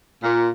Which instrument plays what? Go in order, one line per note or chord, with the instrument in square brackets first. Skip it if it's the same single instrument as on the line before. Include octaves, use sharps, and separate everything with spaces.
[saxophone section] A#2